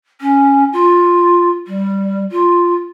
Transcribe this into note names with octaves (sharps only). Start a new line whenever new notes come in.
C#4
F4
G3
F4